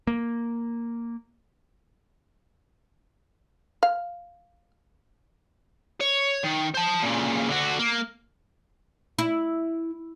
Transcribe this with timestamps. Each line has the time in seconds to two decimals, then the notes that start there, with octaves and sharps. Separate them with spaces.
0.07 A#3
3.83 F5
6.00 C#5
6.44 D#3
6.74 C5 A5
7.03 A#2 C#3
7.49 D3 F#4
7.79 A#3
9.19 E4